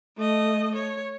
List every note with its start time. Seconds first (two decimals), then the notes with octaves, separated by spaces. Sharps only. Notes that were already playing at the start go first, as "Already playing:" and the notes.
0.17 A3 D#5
0.75 C#5